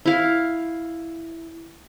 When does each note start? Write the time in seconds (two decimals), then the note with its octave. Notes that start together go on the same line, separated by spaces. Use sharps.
0.06 E4 F5